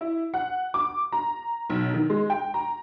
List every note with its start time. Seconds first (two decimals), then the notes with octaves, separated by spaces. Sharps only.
0.01 E4
0.34 F#5
0.74 D6
1.12 A#5
1.70 B1
1.94 D#3
2.10 G#3
2.30 G5
2.54 A#5